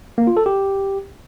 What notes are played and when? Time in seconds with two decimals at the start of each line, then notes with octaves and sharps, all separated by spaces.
0.18 A#3
0.27 F4
0.37 A4
0.46 G4